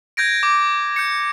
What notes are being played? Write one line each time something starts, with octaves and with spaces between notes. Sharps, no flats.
G6 G#6 A#6 D7
D6
G6 C#7